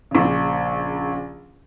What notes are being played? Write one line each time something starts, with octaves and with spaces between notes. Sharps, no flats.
A#1 C#3